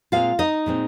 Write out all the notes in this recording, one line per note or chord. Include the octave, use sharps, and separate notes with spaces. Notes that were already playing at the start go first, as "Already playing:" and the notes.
A#2 G#3 C4 F4 F5
D#4 D#5
A#2 G#3 C4